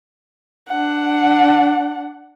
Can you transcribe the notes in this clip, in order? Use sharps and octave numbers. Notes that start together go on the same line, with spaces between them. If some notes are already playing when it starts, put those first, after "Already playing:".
D4 F#5